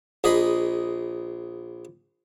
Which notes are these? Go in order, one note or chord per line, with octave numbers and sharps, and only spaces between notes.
A#1 G#4 D#5 B5